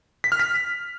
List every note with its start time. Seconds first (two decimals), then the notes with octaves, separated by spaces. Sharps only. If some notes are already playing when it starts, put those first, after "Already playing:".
0.24 B6
0.32 F6
0.39 B6